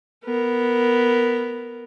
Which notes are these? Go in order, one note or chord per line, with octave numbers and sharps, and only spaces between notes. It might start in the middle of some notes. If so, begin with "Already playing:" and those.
B3 A#4